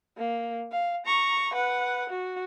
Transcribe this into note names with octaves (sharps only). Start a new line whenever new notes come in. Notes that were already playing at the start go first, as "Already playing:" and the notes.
A#3
F5
A#5 C#6
B4 F#5
F#4